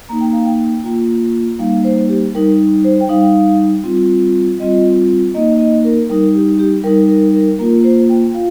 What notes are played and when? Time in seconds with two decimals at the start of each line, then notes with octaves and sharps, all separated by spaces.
0.09 A#3 D#4 A#5
0.21 G5
0.33 F5
0.46 G5
0.84 A#3 F4
1.59 G3 A#3 D#4 F5
1.84 C5
2.09 G4
2.34 G3 D#4 A#4
2.84 C5
3.01 G5
3.09 G3 D#4 F5
3.84 G3 C4 F4
4.59 G3 C4 F4 D#5
5.34 A#3 D#4 D#5
5.59 D#5
5.85 A#4
6.09 G3 D#4 A#4
6.35 G4
6.59 G4
6.84 G3 A#4
6.87 D#4
7.09 A#4
7.34 A#4
7.59 A#3 F4 A#4
7.84 C5
8.09 G5
8.34 F4 F5